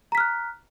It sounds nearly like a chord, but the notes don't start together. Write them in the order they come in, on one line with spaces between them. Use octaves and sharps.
A#5 B6 F6 F#6